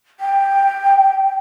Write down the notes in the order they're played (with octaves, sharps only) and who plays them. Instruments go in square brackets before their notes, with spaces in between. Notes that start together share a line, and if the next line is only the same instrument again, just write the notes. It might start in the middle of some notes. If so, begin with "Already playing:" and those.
[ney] G5